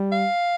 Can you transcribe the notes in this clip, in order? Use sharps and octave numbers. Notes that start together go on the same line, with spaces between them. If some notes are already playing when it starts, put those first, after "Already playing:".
Already playing: G3
F5